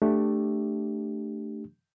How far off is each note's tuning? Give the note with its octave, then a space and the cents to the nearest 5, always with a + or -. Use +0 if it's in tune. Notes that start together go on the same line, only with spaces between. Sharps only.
A3 +0 D4 +10 G4 +0